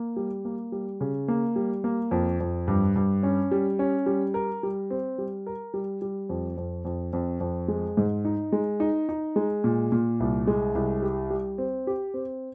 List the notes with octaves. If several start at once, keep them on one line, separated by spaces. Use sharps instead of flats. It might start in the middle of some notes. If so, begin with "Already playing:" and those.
Already playing: A#3
G3
A#3
G3
C#3
A#3
G3
A#3
F2
F2
G2
G2
C#4
G3
C#4
G3
A#4
G3
C4
G3
A#4
G3
G3
F2
F2
F2
F2
F2
G#3
G#2
D#4
G#3
D#4
D#4
G#3
A#2
A#2
C2
G#3
C2
G4
G3
C4
G4
C4